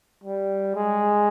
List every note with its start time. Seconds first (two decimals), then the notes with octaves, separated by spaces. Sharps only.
0.24 G3
0.75 G#3